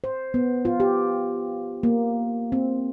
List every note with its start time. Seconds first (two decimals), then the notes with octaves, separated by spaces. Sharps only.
0.04 C5
0.34 B3
0.65 F4
0.80 G4
1.83 A#3
2.52 C4